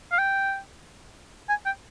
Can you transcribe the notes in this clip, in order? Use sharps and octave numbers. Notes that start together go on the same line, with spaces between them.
F5
G5
G#5
G5